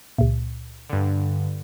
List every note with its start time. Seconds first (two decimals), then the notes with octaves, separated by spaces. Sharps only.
0.18 C#2 A#2
0.90 G2 D3